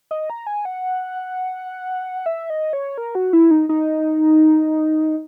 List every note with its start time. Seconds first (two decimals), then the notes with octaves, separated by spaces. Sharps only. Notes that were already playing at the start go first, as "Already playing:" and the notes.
0.11 D#5
0.30 A#5
0.47 G#5
0.65 F#5
2.26 E5
2.50 D#5
2.73 C#5
2.98 A#4
3.15 F#4
3.33 E4
3.51 D#4
3.69 D#4